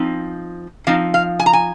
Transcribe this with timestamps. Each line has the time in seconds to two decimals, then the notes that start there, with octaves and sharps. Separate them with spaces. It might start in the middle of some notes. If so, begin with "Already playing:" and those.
Already playing: F3 C4 D#4
0.87 F3 C4 D#4 F5
1.14 F5
1.39 G#5
1.46 A#5
1.53 G#5